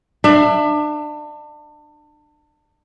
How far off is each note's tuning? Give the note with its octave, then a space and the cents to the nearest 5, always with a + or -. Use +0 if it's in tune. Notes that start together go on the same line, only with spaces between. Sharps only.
D4 +30 E5 +20